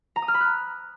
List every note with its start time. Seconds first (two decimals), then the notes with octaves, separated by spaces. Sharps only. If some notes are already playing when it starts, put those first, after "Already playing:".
0.16 A#5
0.22 D#6
0.28 F6
0.34 B5
0.40 F#6